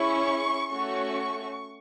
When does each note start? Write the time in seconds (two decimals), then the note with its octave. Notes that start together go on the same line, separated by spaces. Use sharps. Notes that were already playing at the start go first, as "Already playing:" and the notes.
Already playing: C#4 E4 G#4 C#6
0.70 A3 C#4 F#4 C#6